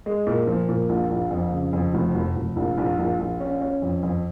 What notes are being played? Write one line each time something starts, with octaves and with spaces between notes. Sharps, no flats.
G#3
A#2
F3
A#2
A#1
A#1
F2
C#3
F2
F1
F1
F1
A#1
A#1
A#1
A#1
C#4
C#4
F2
F2